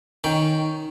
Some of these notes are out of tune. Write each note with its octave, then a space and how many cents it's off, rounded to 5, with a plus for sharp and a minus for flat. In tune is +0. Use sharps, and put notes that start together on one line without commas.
D#3 +0 C#4 +0 G5 +5